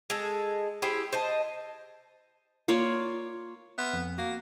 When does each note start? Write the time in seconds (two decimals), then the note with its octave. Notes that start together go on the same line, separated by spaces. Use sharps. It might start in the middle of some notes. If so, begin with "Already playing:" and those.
0.10 G#3 A4
0.82 E4 G4 G#4 C5
1.13 C5 D#5 A5
2.68 A#3 F4 C#5 D5
3.78 B3 E5 C6 F6
3.93 F2
4.18 A#3 F#4